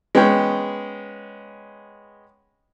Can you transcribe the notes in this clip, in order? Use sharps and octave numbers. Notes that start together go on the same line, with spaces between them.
G#3 B3 C#4 G5